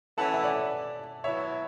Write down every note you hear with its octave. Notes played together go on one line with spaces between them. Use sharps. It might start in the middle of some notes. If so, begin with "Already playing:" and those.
E3 A3 C#4 E4 F#5 A5
E5
D5 F#5
F#3 B3 E4 C#5 E5